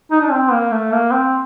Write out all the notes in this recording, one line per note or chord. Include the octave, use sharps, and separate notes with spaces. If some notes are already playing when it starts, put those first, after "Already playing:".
D#4
D4
C4
A#3
A3
A#3
C4